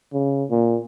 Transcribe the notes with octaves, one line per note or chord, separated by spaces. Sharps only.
C#3
A#2